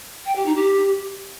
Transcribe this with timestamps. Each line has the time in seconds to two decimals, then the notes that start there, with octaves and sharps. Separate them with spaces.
0.25 G5
0.35 G4
0.45 D#4
0.55 G4